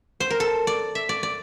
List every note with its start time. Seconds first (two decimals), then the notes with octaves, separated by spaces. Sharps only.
0.20 C5
0.30 A#4
0.40 A4
0.67 D5
0.95 E5
1.09 D5
1.23 D5